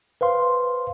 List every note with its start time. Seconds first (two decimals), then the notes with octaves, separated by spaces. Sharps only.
0.21 B4 C5 F5 C6